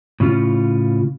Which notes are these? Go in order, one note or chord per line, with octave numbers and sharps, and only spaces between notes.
A2 C#3 C#4 F4